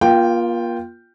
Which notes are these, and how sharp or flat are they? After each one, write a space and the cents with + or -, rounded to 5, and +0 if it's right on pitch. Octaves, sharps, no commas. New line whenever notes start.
A#3 +35 F4 +0 G5 +0